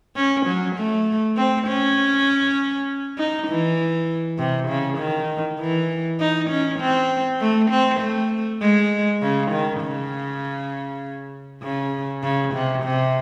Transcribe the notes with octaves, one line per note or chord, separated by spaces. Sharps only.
C#4
F#3
A3
C4
C#4
D#4
E3
C3
C#3
D#3
E3
D#4
C#4
C4
A3
C4
A3
G#3
C#3
D#3
C#3
C#3
C#3
C3
C3